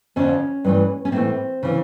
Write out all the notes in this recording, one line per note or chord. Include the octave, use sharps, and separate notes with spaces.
F2 D3 F3 C#4
G2 E3 A3
C#4
A2 E3 A3 C4
C#3 E3